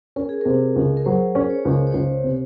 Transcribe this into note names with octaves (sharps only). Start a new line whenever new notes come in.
C#4 A#4
G#4
C3 A#4
C#2
A#4
F#3 C5
C#4
C#5
C#2 C#5
C#5
C#2 C5
C3